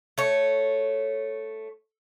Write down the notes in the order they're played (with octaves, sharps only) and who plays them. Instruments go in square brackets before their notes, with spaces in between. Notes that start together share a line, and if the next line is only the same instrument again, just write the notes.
[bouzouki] A3 C#5